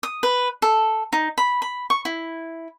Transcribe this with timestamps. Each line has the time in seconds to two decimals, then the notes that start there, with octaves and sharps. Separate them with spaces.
0.03 D#6
0.23 B4
0.62 A4
1.13 D#4
1.38 B5
1.62 B5
1.90 C#6
2.05 E4